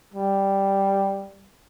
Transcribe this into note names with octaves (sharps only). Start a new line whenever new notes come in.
G3